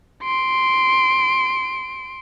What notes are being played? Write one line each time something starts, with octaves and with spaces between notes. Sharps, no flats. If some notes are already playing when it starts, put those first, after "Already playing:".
C6 D7